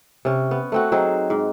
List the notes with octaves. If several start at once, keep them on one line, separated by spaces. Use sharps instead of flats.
C3 C#4
B3
A3 C4 F#4
F#3 C4 D#4 G#4
G#2